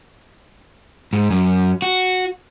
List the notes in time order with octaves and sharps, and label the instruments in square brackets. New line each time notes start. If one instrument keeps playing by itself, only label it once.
[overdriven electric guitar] G#2
F#2
F#4